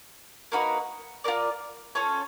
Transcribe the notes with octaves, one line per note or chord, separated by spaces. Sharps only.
A#3 D#4 F#4 B4
F4 A#4 D5
C#4 F4 A4 C#5